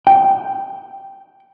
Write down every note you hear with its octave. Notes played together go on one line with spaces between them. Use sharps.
G5